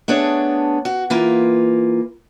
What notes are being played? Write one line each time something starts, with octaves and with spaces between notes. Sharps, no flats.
A3 B3 D4 G#4 C#5
F#4
E3 A#3 F4 B4